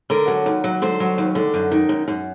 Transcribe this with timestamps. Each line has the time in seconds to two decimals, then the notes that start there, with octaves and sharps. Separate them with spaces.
0.10 D3 A#4
0.28 F#3
0.46 D#2
0.64 F#3
0.82 D3 C5
1.00 F#3
1.18 D#2
1.35 D3
1.54 F#2
1.72 D#3
1.89 F#2
2.08 F#2